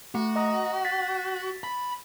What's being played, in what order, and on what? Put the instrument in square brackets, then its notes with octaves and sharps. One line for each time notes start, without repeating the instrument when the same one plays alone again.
[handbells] A3 [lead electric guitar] F#4
[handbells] D#5 A#5 D#6
A6 B6
[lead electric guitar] B5